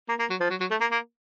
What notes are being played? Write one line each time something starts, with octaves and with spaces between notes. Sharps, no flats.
A#3
A#3
F#3
F3
F#3
F#3
A3
A#3
A#3